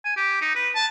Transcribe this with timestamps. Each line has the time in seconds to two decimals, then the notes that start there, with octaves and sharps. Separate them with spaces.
0.05 G#5
0.17 G4
0.41 D#4
0.55 B4
0.75 A5